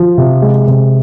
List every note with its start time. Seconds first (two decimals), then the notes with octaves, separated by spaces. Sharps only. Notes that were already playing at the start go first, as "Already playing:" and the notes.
Already playing: F3
0.18 C3
0.42 G#3
0.67 C3